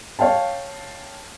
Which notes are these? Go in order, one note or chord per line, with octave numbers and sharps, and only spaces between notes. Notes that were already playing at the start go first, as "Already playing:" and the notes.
C#5 F5 G5 A5